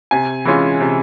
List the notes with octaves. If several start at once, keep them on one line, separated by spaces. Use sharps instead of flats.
C3 G#5
E3 G#3 C#4 F4
C3